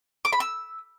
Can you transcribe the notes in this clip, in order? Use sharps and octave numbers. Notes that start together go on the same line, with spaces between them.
D6
B5
E6